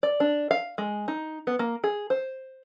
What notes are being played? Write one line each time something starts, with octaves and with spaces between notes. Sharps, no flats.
D5
D4
F5
G#3
D#4
B3
A#3
G#4
C5